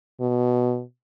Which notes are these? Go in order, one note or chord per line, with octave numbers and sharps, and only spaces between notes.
B2